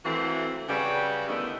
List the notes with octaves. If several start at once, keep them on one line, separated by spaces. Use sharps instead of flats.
E3 F#3 A3 A#3 C4 F#4
C#3 F#3 G3 F#4 G4 B4
A2 D3 D#3 A3 B3 D#4